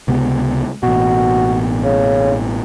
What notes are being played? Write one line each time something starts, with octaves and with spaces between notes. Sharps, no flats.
C#2 C3 B3
A1 B2 F#4
C#3